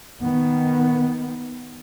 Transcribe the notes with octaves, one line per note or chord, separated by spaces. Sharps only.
D#3 B3